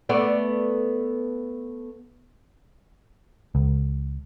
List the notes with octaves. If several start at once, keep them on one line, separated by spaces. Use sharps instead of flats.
A3 B3 D5
C#2